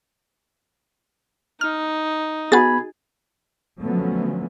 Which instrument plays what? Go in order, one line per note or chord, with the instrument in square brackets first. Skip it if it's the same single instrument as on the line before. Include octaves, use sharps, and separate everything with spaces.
[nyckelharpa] D#4 [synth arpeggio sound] F6
[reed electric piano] B3 B5 [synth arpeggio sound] F#4 A6 [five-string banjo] G#4
[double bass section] D3 F3 F#3 A3 B3 C#4